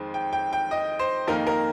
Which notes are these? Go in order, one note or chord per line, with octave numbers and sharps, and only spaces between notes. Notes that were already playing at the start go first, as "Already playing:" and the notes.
Already playing: F2 D#3 G#3 C4
G5
G5
G5
D#5
C5
F2 D#3 A#3 D#4 A#4
A#4